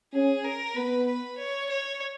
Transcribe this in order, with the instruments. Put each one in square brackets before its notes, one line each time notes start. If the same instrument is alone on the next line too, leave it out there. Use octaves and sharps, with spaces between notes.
[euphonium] C#4 [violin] G#4
[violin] A#4
[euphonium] B3 [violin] B4
[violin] B4
C#5
C#5